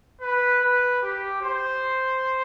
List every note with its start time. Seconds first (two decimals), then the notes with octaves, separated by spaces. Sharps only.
0.21 B4
0.61 B4
1.02 G4
1.42 C5